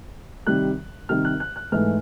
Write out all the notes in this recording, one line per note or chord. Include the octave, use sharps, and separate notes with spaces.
C3 D#3 G3 F#6
C3 D#3 G3 F6
F#6
F#6
F#6
G#2 E3 A3 F6